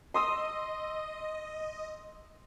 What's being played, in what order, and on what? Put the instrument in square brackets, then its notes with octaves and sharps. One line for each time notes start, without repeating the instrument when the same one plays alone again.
[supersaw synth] D#5 [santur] C6 D#6 E6